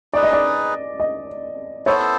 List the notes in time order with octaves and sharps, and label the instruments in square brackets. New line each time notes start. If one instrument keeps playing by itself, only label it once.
[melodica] D#4 G#4 B4 [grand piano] D5
[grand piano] D#5
D5
D#5
[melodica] B3 E4 A4 C5 [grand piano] C#5